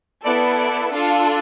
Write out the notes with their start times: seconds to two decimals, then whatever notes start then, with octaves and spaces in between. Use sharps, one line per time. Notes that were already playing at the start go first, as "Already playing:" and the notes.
0.24 B3 E4 A4 D5
0.59 D5
0.93 D4 F4 A4 F5